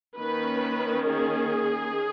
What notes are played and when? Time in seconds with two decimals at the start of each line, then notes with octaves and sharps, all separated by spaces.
0.17 D#3 A#3 C#4 B4
1.08 G#4